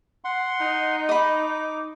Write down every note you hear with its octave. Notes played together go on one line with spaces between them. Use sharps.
F#5 C6
D#4
D#5 B5 D6